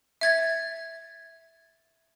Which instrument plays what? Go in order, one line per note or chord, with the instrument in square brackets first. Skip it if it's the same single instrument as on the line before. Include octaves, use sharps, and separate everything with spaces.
[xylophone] E5 G#6 A6